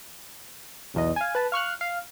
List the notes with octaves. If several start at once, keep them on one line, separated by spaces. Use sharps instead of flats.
B1 E2 D#5
F5 G#5
B4 A5
F5 C#6 F6 F#6
F5